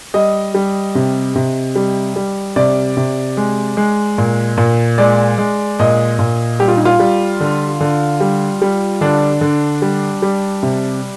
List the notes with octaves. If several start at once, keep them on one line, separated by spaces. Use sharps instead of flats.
G3 D#5
G3
C3
C3
G3
G3
C3 D5
C3
G#3
G#3
A#2
A#2
G#3 D5
G#3
A#2 D#5
A#2
G3 G4
F4
D#4
F4
G3
D3
D3
G3
G3
D3 D4
D3
G3
G3
C3